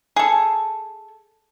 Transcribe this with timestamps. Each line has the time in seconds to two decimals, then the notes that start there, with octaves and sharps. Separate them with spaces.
0.16 G#4 A4